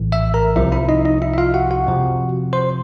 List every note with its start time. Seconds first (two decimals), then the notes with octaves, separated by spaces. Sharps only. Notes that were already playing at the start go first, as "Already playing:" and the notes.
Already playing: A#1 A2 E3
0.12 E5 E6
0.34 A#4 A#5
0.56 C2 C3 F3 E4 E5
0.72 E4 E5
0.89 D#4 D#5
1.05 D#4 D#5
1.22 E4 E5
1.34 E5
1.38 F4 F5
1.54 F#4 F#5
1.71 F#4 F#5
1.87 F2 C3 F3
2.53 C5 C6